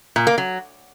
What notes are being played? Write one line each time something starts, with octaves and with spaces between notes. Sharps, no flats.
A#2
A#3
F#3